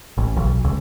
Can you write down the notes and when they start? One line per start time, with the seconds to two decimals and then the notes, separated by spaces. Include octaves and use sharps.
0.17 A1
0.37 B1
0.64 C#2